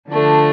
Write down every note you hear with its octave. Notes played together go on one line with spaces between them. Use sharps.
D3 F3 A3 D4